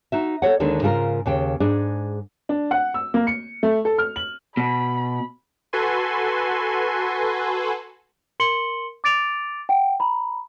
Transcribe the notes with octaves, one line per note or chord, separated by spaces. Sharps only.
D#4 F#4 E5
A4 C5 C#5 F#5
D#2 D3 D#3 G#3 D4
G#2 C#3 F4 G#4 A#4
D#2 C#3 G5
G#2 D4 G#4
D4
F#5
E6
A#3
C#7
A3
A4
F6
F#7
B2 B5
F#4 A4 B4 G#5 C6
A#4 C6 C#7 F#7 G7
D6 A6 D7 F7
F#5 G5
A#5 B5